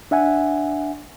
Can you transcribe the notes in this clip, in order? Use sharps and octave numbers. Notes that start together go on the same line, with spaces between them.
D4 E5 F#5 G#5